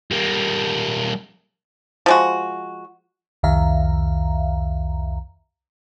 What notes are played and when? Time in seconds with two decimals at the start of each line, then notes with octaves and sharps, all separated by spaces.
0.11 G3 A#3
2.06 F3 G#3 F#4
3.43 C2 F2 D#3 E5 F5 A#5